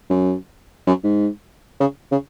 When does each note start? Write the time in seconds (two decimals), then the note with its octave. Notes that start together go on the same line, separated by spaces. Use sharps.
0.10 F#2
0.87 F#2
1.04 G#2
1.80 C#3
2.12 C#3